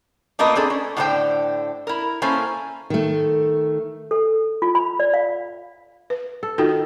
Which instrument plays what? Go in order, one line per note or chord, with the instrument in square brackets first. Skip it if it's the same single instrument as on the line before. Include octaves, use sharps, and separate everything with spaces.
[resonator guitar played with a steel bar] A3 A#3 F4 A#4 B4 D#5
C4 D4 G#4 A4
C#4
A2 D3 A3 D4 C5 G5
E4 A#4
A#3 C#4 E4 A4 C5 G#5
[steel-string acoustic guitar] D#3 A3
[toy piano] A4
F4
B5
D5
F5
[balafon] B4
[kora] A4
[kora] D#3 [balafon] F4 F#4 A4